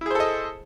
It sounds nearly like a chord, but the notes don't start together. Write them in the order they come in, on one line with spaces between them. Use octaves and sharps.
E4 G#4 C5 A4 D#5